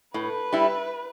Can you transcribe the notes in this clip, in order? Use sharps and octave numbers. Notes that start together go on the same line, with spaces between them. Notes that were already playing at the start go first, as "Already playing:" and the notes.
A2 B4
G3 E4